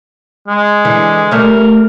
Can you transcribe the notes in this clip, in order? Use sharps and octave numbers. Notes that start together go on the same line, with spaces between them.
G#3
D3 E3
G3 A3 C#4 A#4